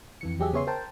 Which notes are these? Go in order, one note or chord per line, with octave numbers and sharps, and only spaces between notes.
F2 E3 C#7
E2 F#3 G4 G#4 E5
C#3 B3 G#4 C#5 E5 C6
A#4 C5 G5 A5